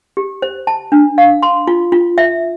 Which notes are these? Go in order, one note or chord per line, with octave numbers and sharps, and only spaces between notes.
G4
C5
A5
D4
F5
C6
F4
F4
E5